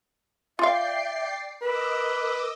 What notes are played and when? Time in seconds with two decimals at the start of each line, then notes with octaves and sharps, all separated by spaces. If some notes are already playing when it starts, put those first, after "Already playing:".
0.59 F4 D5 E5 F5 G5 C7
1.62 A#4 B4 D#5 D6 E6